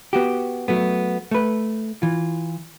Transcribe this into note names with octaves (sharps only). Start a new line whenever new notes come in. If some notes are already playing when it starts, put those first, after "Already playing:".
B3 F#4 G4
F#3 A3 B3
A3 B4
E3 F4